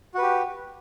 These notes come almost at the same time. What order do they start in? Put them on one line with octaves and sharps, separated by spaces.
F#4 B4 G4